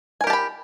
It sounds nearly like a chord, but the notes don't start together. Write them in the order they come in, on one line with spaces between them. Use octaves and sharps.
G#5 A#4 G4 A5 B5